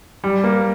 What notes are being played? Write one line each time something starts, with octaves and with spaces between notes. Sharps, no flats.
G3
A#3